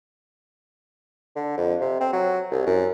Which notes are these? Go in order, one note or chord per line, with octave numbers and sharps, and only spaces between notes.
D3
F2
C3
C4
F#3
C2
F#2